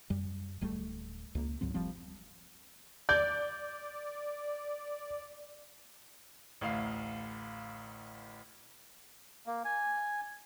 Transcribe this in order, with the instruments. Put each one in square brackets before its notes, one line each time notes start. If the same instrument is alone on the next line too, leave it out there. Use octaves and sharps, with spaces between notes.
[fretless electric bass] F#2 G3
D1 G3 A3
C#2 A#3
C#2 G#2 F#3 C4
F1 F3 G3 C4
[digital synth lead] D5 [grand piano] G6
[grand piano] A1 D2 F5 C7
[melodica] A#3
G#5